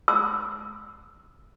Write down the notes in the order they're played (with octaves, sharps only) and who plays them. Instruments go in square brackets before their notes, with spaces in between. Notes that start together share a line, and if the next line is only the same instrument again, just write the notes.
[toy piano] E6